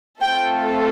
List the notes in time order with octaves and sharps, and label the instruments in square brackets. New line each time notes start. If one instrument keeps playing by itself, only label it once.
[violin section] A3 C4 F4 A4 G5